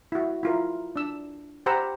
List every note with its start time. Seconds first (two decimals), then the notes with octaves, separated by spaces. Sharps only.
0.12 E4 F#4
0.43 E4 F4 A#4
0.96 D4 E6
1.66 G4 C5 F#5 A#5 B5 E6